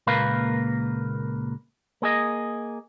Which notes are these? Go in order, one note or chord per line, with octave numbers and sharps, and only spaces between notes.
C#2 A#2 A#3 A#4 B4 F5
A#3 G#4 D#5